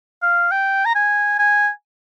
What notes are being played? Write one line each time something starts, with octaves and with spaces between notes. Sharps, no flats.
F5
G5
A#5
G#5
G#5